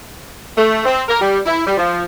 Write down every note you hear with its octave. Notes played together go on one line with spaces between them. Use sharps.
A3
C4
A#4
G3
E4
G3
F3